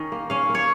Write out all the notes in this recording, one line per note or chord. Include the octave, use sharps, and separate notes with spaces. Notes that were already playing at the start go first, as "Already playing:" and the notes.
Already playing: D#3 C#4
A#3
C#4 F5
A#3
C#5